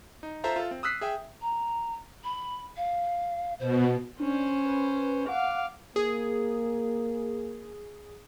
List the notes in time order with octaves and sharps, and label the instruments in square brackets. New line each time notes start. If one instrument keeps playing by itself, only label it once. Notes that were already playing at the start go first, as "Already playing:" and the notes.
[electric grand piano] D#4
F4 A4 C5 E5 A5 A#5
F4 A4
C4
D#6 E6 F#6 B6 C7
G#4 E5 G5
[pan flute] A#5
B5
F5
[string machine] B2 [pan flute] C5
[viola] C#4 C5 [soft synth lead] D4
[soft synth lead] B4
[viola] F5 D6 [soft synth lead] F#5
[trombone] A#3 [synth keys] G#4